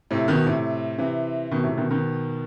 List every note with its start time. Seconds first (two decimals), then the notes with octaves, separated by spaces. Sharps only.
0.11 A2 C3
0.28 B2 D#3
0.46 A2 C3
0.98 C3 E3
1.51 B2 D#3
1.64 A2 C3
1.77 B2 D#3
1.90 B2 D#3